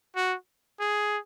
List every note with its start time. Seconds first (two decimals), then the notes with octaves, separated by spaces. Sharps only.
0.16 F#4
0.80 G#4